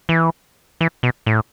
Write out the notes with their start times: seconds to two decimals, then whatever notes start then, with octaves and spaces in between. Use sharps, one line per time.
0.09 E3
0.81 E3
1.03 B2
1.26 A2